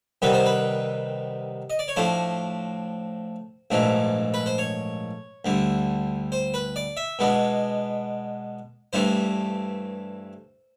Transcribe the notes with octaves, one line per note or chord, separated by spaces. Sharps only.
C2 C3 D#3 G3 B3 B4
C5
B4
D#5
D5
C#5
A2 F3 A3 D4 C5
A#1 G#2 E3 A3 D4
B4
C5
C#5
D2 D3 G3
C5
B4
D5
E5
B2 G#3 B3 D4
G2 E3 A3 D4 C5